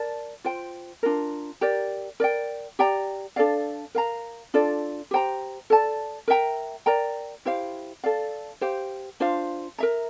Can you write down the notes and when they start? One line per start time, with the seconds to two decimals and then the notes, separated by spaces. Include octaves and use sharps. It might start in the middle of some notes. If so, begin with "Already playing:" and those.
Already playing: A#4 D5 A5
0.44 F4 C5 G5
1.03 D4 F4 A#4
1.61 G4 A#4 D5
2.20 A#4 D5 G5
2.79 G4 D5 G5 A#5
3.36 D4 A4 D5 F5
3.95 A#4 F5 A#5
4.54 D4 F4 A4 D5
5.11 G4 C5 G5 A#5
5.70 A4 D5 A5
6.28 A#4 E5 G5 A#5
6.86 A#4 D5 G5 A#5
7.45 E4 G4 C5 F5
8.04 A4 D5 F5
8.61 G4 C5 F5
9.20 D4 F4 C5 F5
9.78 A#4 E5 A#5